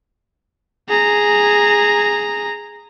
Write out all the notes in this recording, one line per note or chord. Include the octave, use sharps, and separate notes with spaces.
G#4 A#5